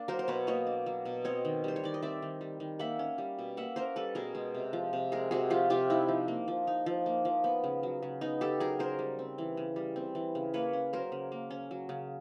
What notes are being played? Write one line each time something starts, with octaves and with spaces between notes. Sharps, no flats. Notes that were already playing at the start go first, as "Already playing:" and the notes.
Already playing: A#3 D4
F#3 A#4 C5
C5
B2 B4 C#5
A#3 C#5 D#5
D4
F#3
B2
C4 C#5 D#5
D#3
G3 C5
C#5
D#3 D5
D#5
C4 D5 E5
D#3
G3
D#3
A#3 E5 F#5
C#4
G3
B2
A#3 E5 F#5
C#4 A#4 C5
G3 A4 B4
B2 G#4 A#4
G#3
C3
F3
C3
G#3 G#4 A#4
C3 F#4 G#4
F3 F4 G4
C3 F4 G4
D#4 E4
F3
A#3
F3
D#4
F3
A#3
F3
B3
C#3
F#3
C#3
B3 D#4
C#3 G4 A4
F#3 G#4 A#4
C#3 A#4 C5
G3
C4
E3
C#3
G3
C4
E3
C#3
A#3 B4 C#5
C#4
F#3 A#4 C5
C#3
A#3
C#4
F#3
C#3